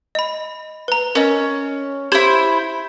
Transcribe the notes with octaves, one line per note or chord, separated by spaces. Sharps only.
D#5 B5
B4 A#5
C#4 A#4 D#5
E4 G4 C5 G#6 F#7